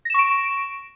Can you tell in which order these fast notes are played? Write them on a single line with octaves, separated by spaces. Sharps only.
A#6 E7 C#6 D7